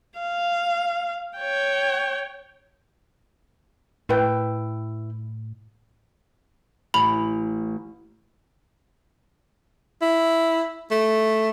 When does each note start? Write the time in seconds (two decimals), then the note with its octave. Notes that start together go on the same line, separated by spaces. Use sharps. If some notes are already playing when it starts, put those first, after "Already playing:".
0.19 F5
1.38 C#5 G5
4.09 A2 E4 B4 G5
6.94 A1 B5 F7
10.02 E4
10.91 A3